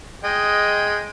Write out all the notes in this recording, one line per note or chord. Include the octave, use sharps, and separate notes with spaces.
G#3 D#5 G5